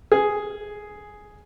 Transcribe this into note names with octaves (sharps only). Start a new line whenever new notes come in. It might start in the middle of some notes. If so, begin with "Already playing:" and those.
G#4